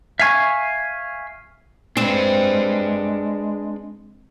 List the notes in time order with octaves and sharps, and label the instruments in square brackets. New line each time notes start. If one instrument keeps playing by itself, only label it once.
[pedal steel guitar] E5 F5 G#5 C#6
[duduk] G#3 [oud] C4 [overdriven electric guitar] D4 B4